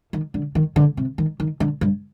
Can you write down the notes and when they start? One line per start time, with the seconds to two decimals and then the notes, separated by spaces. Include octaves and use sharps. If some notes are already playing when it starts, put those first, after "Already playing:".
0.13 D#3
0.34 D3
0.55 D#3
0.76 D3
0.97 C3
1.18 D#3
1.40 D#3
1.60 D3
1.81 G2